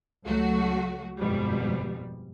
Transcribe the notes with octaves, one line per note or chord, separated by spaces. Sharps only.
C#2 F#3 A3 F#4
G1 F2 G#2 B2 G3